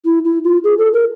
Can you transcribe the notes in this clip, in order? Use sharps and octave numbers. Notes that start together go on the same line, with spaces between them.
E4
E4
F4
G#4
A4
A#4